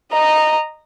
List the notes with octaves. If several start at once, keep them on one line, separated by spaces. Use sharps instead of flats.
D#5 A#5